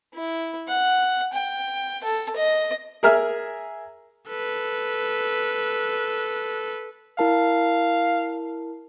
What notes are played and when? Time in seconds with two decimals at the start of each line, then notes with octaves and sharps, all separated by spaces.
0.14 E4
0.68 F#5
1.33 G5
2.03 A4
2.36 D#5
3.03 G#4 A#4 E5 F6
4.28 A4 B4
7.19 E4 A#4 F5 A5